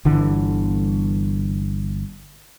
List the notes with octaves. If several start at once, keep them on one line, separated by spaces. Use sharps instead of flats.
G1 D3 E3